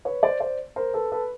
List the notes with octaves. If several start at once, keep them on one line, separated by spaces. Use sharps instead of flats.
B4 C#5
C5 D5
C5 D5
A#4 C5
A4 B4
A4 B4